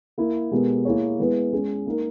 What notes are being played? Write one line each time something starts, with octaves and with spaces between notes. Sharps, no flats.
A#3 E4 A#4
B2 G#3 B3 G4 A#4
A#3 E4 G#4 C#5
G#3 B3 E4 G#4 B4
G#3 C#4 G#4
A#3 D#4 A#4